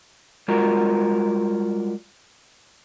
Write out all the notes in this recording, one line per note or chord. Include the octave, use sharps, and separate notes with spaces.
G3 G#3 F4 F#4 A#4